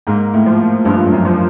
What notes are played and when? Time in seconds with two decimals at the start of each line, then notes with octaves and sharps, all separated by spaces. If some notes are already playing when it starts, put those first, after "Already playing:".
0.07 G#2 A#3
0.34 A2
0.46 F3
0.85 G2 F3
1.06 G2
1.12 F#2
1.25 F3